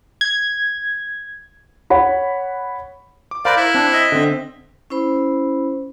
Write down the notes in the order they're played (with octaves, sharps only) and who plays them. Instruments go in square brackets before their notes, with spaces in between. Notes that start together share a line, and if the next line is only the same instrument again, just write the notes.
[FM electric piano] G#6
[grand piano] C#5 F#5 B5
[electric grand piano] D6
[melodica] A#4 C5 [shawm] D5 [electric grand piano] F5 B5 F#6
[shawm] E4 [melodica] A#4
[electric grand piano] C4 [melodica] D4
[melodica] D#5 E5
[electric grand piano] D3 C4
[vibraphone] C#4 E4 C5 B5